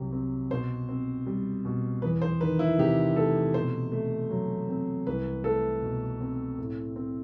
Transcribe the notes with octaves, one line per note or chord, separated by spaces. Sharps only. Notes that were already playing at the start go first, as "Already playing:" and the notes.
Already playing: C2 C3 F#3 G4
C4
B2 C5
C4
G3
B2
E2 B4
C5
D#3 B4
E4
C3 G4
A3 A4
B2 C5
A3
F#3
C4
C2 B4
A3 A4
B2
C4
A2
C4